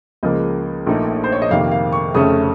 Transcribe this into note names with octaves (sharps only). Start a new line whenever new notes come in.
C#2 C#3 F3 A#3 D#5
A#1 A#2 A3 D#4
C5
C#5
D#5
F2 C3 D#3 A#3 F5
F5
C#6
F1 F2 C#3 A3 C#4 D#6